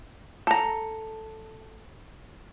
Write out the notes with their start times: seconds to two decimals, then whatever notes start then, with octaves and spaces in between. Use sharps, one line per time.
0.47 A4 A#5